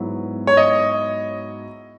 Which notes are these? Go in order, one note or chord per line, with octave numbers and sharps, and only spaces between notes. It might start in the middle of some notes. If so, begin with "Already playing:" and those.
Already playing: G#2 F#3 B3 E4
C#5
D#5